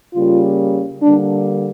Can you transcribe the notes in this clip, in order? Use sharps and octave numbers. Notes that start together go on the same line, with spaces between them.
C#3 G3 A#3 F4
D3 G3 A#3 D4